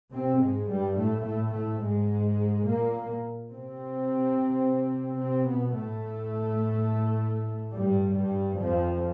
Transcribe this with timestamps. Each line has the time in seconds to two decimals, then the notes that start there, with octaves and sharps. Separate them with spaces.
0.11 C3 C4
0.39 G#2 G#3
0.67 G2 G3
0.97 A2 A3
1.24 A2 A3
1.52 A2 A3
1.81 G#2 G#3
2.65 A#2 A#3
3.50 C3 C4
5.19 C3 C4
5.47 B2 B3
5.75 A2 A3
7.72 G2 G3
8.15 G2 G3
8.58 F2 F3